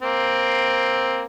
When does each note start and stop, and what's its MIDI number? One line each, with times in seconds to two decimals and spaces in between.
0.02 1.24 58
0.02 1.24 60